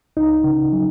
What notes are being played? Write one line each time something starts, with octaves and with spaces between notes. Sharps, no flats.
C#2 D#4
C#3
F#3